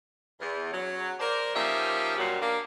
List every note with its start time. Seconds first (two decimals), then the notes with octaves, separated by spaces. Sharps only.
0.41 E2
0.73 F#3 C#4
1.20 A#4 C5 D5
1.55 F3 A#3 C#4 D#4 G4 E5
2.18 F#2 A#2 F#3 G3 F4 F#4
2.42 A#3 D4